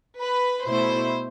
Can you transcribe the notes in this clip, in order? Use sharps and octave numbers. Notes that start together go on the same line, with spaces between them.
B4
B2 A3 E4 C5